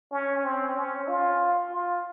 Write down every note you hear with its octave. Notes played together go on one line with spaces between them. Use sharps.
C#4
C4
C#4
F4
F4